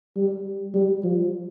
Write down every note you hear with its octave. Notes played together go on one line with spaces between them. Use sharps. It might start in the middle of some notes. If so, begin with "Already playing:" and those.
G3
G3
F3